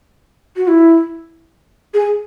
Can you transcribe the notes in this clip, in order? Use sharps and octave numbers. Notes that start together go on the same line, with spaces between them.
F#4
E4
G#4